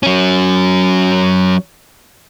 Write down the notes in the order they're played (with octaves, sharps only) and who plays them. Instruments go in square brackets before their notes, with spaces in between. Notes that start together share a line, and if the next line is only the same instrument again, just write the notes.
[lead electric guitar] F#3 C#4